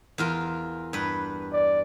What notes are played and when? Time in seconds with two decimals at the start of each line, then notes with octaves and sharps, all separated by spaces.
0.18 E2 F4 A#4
0.93 G2 B4
1.53 D5